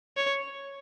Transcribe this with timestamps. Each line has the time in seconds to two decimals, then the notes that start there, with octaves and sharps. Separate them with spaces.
0.17 C#5